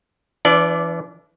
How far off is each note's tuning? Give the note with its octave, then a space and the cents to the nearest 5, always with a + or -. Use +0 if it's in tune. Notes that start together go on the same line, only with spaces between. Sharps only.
E3 +20 D4 -35 D5 +0